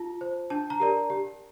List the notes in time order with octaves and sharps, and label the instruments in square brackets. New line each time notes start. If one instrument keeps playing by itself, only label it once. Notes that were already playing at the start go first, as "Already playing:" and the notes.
Already playing: [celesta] F4 A5
C5
D4 A5
A#5
G4 A#4 D5
G4